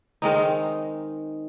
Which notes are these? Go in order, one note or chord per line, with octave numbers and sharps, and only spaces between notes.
D#3 G#3 C4 D#4